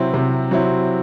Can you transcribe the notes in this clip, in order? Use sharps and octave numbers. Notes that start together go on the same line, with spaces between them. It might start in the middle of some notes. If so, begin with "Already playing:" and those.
Already playing: C3 F#3 C4 E4
C3
F#3 C4 E4